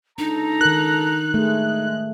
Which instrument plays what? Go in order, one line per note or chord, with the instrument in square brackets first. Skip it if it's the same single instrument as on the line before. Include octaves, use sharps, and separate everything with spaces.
[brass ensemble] C#2 A4 A#5 [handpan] D4 [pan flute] D#4
[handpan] D#3 A#4 [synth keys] F#6
[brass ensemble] G#3 [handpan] A3 G#4